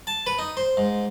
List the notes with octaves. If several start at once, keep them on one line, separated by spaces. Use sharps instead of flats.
A5
B4
D#4
C5
G#2